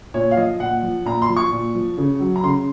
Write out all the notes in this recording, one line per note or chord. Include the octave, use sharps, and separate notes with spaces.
A#2 C#5
F5
F3 D#5
A#2 F#5
F3
A#2 A#5
C6
F3
C#6
A#2
F3
C#3
F#3
A#5
C#3 C6